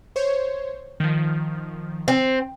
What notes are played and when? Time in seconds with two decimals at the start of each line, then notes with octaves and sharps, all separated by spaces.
0.16 C5 C#5
1.00 D#3 F3
2.08 C4